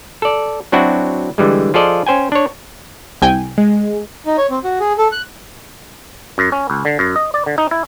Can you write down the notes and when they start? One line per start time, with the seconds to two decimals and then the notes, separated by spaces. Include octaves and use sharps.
0.22 A4 D5
0.72 F#3 C4 D4 E4 F#4
1.38 D3 E3 G3 G#3
1.74 F3 F4 G#4 A4 D5 D#5
2.07 C#4 C5 G5 G#5
2.32 D4 C#5
3.22 C2 G5 G#5
3.58 G#3
4.26 D#4
4.38 C#5
4.50 C4
4.64 F#4
4.80 G#4
4.98 A4
5.12 F#6
6.38 F#2
6.52 C#4
6.70 C#2
6.85 D3
6.99 F#2
7.16 D#5
7.34 D5
7.46 D3
7.58 D#4
7.71 E4